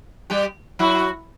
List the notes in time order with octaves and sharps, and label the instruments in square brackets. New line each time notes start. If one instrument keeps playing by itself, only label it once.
[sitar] G3 G4
[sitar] F#3 F#4 [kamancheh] E4